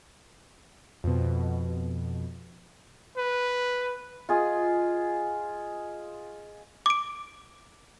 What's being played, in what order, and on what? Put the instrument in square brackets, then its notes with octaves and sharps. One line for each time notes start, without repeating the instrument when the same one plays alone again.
[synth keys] F2 B2
[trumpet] B4
[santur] F4 G#4 D#5
[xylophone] D6 D7